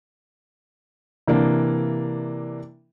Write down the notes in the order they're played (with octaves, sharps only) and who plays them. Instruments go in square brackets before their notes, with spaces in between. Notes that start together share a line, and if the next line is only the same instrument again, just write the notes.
[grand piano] C3 E3 A#3 D4